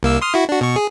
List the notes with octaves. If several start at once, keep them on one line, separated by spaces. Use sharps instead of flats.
C2 A#3 E6
C6 D#6 F6
E4 F#4
D4 F#4
B2 C#6
G#4